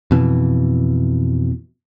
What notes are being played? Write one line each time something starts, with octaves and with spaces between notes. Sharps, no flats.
F2 B2 E3